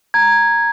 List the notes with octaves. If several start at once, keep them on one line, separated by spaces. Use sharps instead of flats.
A#5 G#6